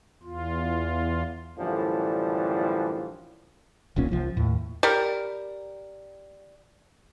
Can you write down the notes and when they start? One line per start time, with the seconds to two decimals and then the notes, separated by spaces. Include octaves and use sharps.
0.23 E2 F4
1.58 F#2 A2 D3 E3 F3 G3
3.96 D#1 B1 A#2 C#4
4.12 C2 F3
4.37 D#2 A2
4.83 G3 A#4